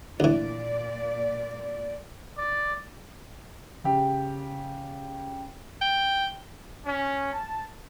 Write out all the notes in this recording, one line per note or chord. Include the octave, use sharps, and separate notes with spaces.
D2 A#2 E3 D5
D5
C#3 G4
G5
C#4
A5